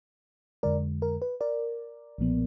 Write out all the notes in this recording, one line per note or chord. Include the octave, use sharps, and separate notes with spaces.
F2 D3 G#3 A#4 D5
A#4
B4
A#4 D5
B1 A#2 F3 B3